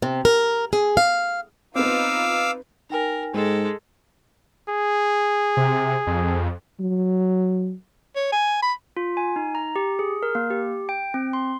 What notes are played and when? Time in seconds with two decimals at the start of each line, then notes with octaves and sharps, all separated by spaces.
0.02 C3
0.25 A#4
0.73 G#4
0.97 F5
1.75 B3 C4 D#4 F4 B4 F5 D6 E6
2.90 D#4 A#4 G5 G#5
3.34 G#2 G#3 A4
4.69 G#4
5.57 C3
6.07 F2
6.80 F#3
8.15 C#5
8.32 G#5
8.62 B5
8.97 F4
9.17 G#5
9.36 D#4
9.55 A#5
9.76 G4
9.99 G#4
10.23 A#4
10.35 A#3
10.50 G4
10.89 G5
11.14 C4
11.33 C6